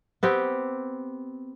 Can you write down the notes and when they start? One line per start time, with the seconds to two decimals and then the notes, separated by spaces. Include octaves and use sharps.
0.23 B3 C4 G4